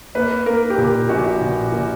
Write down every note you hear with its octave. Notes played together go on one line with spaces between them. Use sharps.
A#3 B4
A#3 A#4
G4
A#2 A#4
A#1 F#4
A#2
A#2